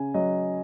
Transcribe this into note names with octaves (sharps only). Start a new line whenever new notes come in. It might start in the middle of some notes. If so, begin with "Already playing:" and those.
Already playing: C#3 G#5
F#3 D#5